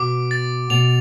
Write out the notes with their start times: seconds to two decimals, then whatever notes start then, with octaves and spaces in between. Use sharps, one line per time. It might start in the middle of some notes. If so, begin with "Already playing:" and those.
Already playing: B2 D6 D7
0.31 A6
0.70 B2 F7